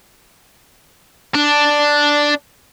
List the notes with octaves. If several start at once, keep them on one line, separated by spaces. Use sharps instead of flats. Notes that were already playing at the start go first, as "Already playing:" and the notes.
D4